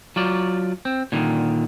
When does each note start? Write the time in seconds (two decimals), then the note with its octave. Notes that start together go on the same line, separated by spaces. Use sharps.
0.16 F#3 F4 D5
0.85 C4
1.12 A#2 D3 D#3